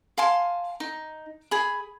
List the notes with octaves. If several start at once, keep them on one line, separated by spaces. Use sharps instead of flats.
F5 G#5 A5 C6
D#4
G#4 B5